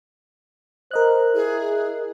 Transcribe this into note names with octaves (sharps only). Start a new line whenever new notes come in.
A#4 C5 D#5 F#6
E4 G#4